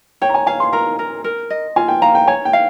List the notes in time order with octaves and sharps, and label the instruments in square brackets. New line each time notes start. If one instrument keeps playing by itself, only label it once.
[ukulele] C#5 [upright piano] G5
[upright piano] A#5
G#5
[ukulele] F5 [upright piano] G#5
[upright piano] C6
[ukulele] A#4 [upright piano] A#5
[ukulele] A#4
A#4
D#5
[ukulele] F4 [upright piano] G#5
[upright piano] G5
[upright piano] F5 [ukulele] A#5
[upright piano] G5
[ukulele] C#5 [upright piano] G#5
[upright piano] G5
[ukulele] F5